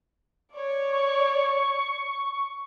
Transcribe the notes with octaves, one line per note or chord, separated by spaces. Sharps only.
C#5 D5
C#6